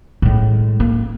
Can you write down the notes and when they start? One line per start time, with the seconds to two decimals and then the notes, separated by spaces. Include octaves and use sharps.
0.22 A2 G#3
0.80 A#3